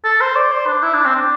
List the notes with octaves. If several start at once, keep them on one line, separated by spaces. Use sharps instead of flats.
A4
C5
D5
C5
D4
E4
D4
C4
D4